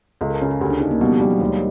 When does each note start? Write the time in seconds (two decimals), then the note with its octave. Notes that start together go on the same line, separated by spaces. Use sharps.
0.21 C#2 A4
0.30 A#4
0.41 C#3 A4
0.51 G#4
0.61 D2 G4
0.70 D4
0.80 C#3 D#4
0.91 A#3
1.01 B2 G3
1.11 F3
1.20 F#3 G3
1.30 F#3
1.40 D#2 G#3